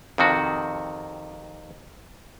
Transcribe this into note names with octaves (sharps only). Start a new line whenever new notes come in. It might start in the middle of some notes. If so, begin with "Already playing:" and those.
F2 C3 D#3 F#4